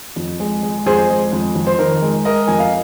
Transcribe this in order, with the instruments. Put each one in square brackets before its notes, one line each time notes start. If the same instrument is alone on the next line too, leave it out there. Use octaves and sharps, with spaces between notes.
[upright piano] F2
G#3
G#3
F2 G#4 C5
G#3
F2
F2
C5
D#3 A#4
G#3
G#3 A#4 D#5
F2 G#5
F5